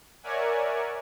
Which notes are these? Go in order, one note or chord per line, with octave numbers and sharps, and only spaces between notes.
A#4 C#5 D5 E5 F#5 G#5